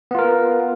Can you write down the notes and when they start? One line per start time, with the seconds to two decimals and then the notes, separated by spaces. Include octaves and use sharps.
0.11 B3
0.15 F4
0.19 A#4